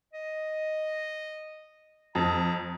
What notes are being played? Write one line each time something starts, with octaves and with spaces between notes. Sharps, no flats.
D#5
F2 A#5